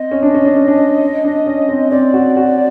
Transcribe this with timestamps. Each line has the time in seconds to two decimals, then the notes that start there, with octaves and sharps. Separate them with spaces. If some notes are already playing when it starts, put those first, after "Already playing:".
Already playing: C4 D#5
0.11 C#4
0.22 D4
0.35 C#4
0.45 D4
0.57 C#4
0.68 D4
0.80 C#4
1.24 D4
1.46 C#4
1.68 C4
1.91 C4 D5
2.14 F#4
2.37 F#4